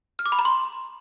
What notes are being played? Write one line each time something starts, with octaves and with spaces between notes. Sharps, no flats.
F6
D6
B5
A#5
C6